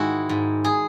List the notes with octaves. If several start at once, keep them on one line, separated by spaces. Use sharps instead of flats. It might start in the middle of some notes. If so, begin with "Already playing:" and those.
Already playing: G#2 D#3 G#3 E4 F#4
G#2
G#4